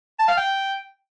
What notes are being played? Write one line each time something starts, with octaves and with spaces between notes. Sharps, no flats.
A5
F5
G5